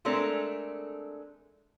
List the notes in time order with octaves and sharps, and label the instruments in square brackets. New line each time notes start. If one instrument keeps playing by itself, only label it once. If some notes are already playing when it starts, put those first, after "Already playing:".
[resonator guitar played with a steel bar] G#3 A3 C4 D4 A4 A#4